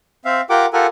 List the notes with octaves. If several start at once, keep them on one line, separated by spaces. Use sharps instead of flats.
C4 E5 F5
F4 G4 A#4 F#5 G5 D6
F4 G4 A4 A#4 F#5 G#5